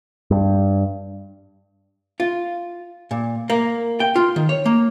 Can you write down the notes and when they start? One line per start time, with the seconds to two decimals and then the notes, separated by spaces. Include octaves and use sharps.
0.31 G2
2.20 F4
3.11 A#2
3.50 A#3
4.00 G5
4.16 F4
4.36 D#3
4.49 C#5
4.66 A#3